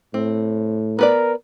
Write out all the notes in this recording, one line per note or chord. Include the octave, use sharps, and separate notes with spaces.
A2 C4
B3 A#4 B4 D5